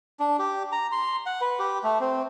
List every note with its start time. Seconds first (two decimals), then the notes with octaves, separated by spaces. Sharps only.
0.20 D4
0.39 G4
0.72 A#5
0.92 C6
1.26 F#5
1.41 B4
1.59 G4
1.84 A3
2.00 C4